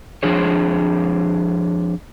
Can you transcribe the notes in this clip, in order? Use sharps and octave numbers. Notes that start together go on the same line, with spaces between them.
F2 C#3 F3 D4 G#4 C#5